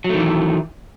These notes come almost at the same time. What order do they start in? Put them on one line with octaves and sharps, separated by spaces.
F#3 A3 D#3 E3